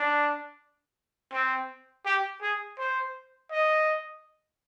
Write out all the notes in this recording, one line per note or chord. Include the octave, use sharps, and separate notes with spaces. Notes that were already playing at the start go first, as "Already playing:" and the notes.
Already playing: D4
C4
G4
G#4
C5
D#5